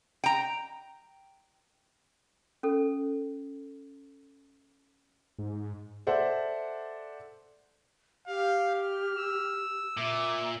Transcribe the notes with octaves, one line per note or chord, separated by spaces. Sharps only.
G5 A#5
C#4 A4
G#2
A4 C5 D5 E5 F#5
G4 F5
F6
E6
A#2 E5 D6